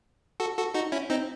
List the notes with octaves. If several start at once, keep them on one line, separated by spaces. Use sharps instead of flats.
F#4 A4
F#4 A4
D#4 F#4
C#4 E4
C4 D#4